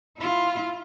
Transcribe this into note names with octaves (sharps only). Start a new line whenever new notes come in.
E4 F4